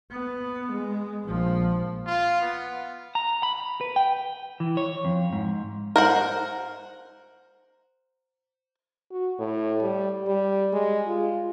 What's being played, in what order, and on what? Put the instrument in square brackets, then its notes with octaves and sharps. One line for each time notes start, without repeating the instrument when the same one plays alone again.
[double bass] B3
G#3
A#1 F3
[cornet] F4
B3
[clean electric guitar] A#5
B5
B4
G5
E3
C#5
F2
G#2
[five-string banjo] A#4 C5 F#5
[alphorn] F#4
A2
G3
G3
G#3
F4